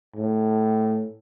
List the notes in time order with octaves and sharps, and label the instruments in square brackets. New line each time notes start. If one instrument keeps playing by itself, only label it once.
[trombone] A2